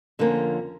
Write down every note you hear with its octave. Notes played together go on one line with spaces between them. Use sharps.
F2 D3 F3 A#3 C#4